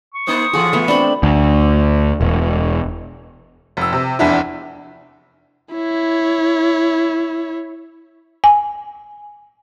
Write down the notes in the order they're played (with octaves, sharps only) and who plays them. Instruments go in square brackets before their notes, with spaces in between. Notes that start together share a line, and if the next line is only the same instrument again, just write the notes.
[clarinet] C#6
[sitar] A#3 D#4 C5 [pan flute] D#6
[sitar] A2 E3 F4 [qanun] G#4 A4
[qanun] A3 B3
[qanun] C4 D4 [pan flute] B5
[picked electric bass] D2
E1
[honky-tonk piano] F1 E6
C3
F1 E2 D4 E4
[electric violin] E4 C#5
[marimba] G#5